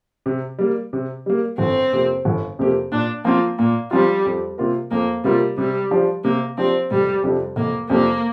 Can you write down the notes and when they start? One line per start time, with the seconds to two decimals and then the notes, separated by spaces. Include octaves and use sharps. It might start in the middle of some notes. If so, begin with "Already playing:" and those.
0.26 C3
0.59 G3 A#3
0.93 C3
1.26 G3 A#3
1.58 G1 C4
1.93 F2 C3 A#3 G4
2.25 G1
2.59 F2 C3 A#3 G4
2.92 A#2 D4
3.25 F3 A#3 C4 F4
3.58 A#2 A#3
3.91 F3 G3 C4 F4
4.25 F2
4.58 C3 A#3 F4 A#4
4.91 F2 A#3
5.24 C3 G3 A#3 F4 A#4
5.58 C3 G3
5.91 F3 D4 G4
6.24 C3 A#3
6.58 F3 C4 D4 G4
6.91 F1 G3
7.24 F2 C3 G3 D4
7.56 F1 A#3
7.90 F2 C3 G3 A#3 D4